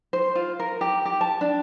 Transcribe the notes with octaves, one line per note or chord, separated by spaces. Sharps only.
C5
F4
A#4
G4
G4
A5
D4